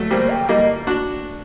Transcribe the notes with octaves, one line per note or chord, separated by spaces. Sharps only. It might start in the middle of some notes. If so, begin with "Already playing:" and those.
Already playing: F#3 A3
G3 A#3 C5
G5
G3 A#3 D#5
D4 F#4